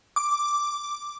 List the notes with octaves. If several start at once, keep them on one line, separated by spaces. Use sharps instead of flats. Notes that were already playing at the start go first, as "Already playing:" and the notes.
D6